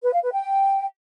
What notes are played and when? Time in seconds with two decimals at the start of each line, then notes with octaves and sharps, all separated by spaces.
0.03 B4
0.13 F5
0.22 B4
0.32 G5